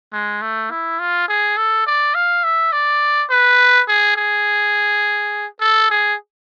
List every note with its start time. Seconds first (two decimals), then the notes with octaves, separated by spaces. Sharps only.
0.13 G#3
0.42 A3
0.71 E4
0.99 F4
1.28 G#4
1.57 A4
1.86 D5
2.15 F5
2.44 E5
2.72 D5
3.30 B4
3.88 G#4
4.16 G#4
5.60 A4
5.90 G#4